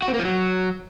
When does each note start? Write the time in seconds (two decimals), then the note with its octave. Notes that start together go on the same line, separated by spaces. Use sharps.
0.02 F#4
0.08 C4
0.14 A#3
0.19 F3
0.25 F#3